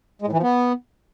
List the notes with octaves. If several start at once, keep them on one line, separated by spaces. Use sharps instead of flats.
G#3
A2
E3
F3
B3